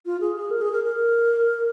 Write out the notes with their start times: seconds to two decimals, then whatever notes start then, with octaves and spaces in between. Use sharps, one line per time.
0.06 F4
0.21 G#4
0.35 G#4
0.51 A#4
0.61 G#4
0.73 A#4
0.84 A#4